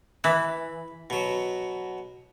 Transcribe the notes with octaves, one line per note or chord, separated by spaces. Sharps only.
E3 B5
B2 F#3